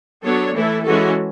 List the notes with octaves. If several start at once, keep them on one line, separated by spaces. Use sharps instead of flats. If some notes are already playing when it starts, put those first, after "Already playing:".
F#3 B3 D4 A4 C#5
E3 A3 E4 A4
E3 G#3 C#4 F#4 A4